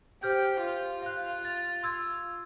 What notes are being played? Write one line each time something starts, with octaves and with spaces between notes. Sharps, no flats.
G4 C5 F6 G6
F4
F5 F#6
A6
C6 E6 G#6